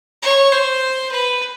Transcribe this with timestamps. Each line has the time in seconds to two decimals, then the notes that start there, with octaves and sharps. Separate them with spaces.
0.23 C#5
0.52 C5
1.11 B4